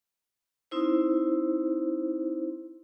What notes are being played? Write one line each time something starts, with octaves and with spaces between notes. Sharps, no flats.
C4 D#4 E4 C5